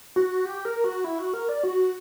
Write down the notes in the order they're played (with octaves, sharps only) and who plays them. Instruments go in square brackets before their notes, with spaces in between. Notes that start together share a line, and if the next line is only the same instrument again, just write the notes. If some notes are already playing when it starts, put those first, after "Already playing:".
[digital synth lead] F#4
G4
A#4
F#4
E4
F#4
A#4
D5
F#4